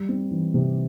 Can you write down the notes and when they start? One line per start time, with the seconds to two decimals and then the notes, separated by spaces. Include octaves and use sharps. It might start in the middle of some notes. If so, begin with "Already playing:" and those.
Already playing: G3
0.09 C4
0.31 E3
0.54 C3